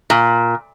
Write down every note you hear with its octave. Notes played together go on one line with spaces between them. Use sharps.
A#2